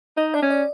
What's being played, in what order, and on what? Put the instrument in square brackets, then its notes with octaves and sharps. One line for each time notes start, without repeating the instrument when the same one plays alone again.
[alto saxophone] D#4 [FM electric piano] D#5
[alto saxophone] D4 [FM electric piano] D5
[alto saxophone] C#4
[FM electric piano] D5